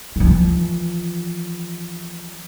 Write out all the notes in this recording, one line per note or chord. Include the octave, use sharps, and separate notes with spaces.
E3 F3